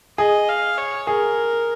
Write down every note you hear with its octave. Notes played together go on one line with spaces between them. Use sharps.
G#4 D#5
F5
C#5
G#4 A#4